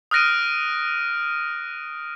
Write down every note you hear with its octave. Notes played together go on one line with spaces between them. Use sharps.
D#6 F6 F#6 A#6 D7 D#7